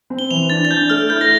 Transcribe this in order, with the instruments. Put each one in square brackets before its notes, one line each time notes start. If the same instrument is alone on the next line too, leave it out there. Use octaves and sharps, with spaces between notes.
[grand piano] C4
[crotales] G7
[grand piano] E3 [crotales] F7
[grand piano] D4 [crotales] A6
[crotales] A6
[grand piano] D4 [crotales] G6
[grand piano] A3 [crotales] F6
[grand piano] E4 [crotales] G6
[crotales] A#6